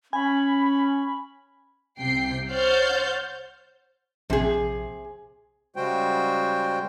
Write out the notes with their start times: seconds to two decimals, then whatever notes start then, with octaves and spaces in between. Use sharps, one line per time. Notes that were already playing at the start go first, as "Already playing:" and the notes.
0.13 C#4 G#5 B5
1.99 C2 C3 G5 C7
2.50 C5 C#5 F#5 F6 G6 A6
4.30 A#1 C3 G#4
5.76 C#3 G3 G#3 F#4 C5 G5